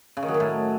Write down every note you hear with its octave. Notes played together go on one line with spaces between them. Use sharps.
C#3
D#3
F#3
D#3
A2